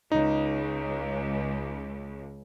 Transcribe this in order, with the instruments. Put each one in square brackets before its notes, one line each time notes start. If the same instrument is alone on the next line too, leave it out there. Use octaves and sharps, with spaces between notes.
[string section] C#2 [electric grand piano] D#4